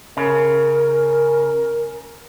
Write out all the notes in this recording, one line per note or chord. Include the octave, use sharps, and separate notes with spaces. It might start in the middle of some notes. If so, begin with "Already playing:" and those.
C#3 A#4